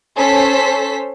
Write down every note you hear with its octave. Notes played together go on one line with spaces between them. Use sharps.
C#4 A4 C5 B6